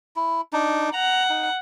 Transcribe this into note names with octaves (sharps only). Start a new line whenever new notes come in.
E4
D4 D#4
F#5 A#5
D#4